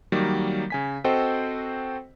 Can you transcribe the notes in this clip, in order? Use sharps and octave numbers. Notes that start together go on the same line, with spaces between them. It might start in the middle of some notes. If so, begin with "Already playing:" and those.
D#3 F#3 G3 A#3
C#3 G#5 B6
C4 F#4 A4 C5 D#5 G5